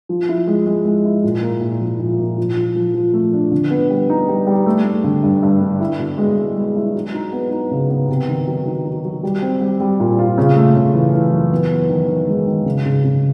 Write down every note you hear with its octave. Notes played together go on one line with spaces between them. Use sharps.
F3
E4
G#3
G#3
G#3
E4
A#2
A#3
A#2
F3
A#2
A#2
F3
F3
F3
F3
A3
D4
D3
B3
G3
D#4
G3
G3
A3
A3
D3
G2
G2
D3
E4
B2
G#3
G#3
G#3
E4
F#3
D#4
B3
D#4
C#3
B3
C3
D#3
F#3
D#3
F#3
F#3
G3
C4
G3
G3
A#2
F4
C#3
A3
C#3
E3
E3
F#2
B3
B3
D#3
D#3
G#3
D#3
C#3
C#3
C#3